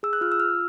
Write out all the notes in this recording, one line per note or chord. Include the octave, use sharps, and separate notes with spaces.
G#4 E6
F#6
F4 F6
E6
F4 F6